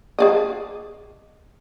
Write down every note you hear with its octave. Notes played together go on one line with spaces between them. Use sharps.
G#4 D5 D#5